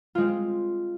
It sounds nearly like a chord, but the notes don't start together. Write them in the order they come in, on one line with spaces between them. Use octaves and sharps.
F4 G#3 C4